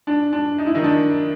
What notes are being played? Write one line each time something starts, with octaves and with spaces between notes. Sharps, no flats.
D4
D4
D#4
E4
D#3 D#4
D4